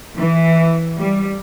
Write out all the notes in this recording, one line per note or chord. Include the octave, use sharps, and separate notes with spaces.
E3
G3